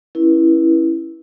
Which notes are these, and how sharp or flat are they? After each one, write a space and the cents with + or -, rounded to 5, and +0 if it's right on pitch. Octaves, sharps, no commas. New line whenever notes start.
C#4 -15 E4 +0 B4 -40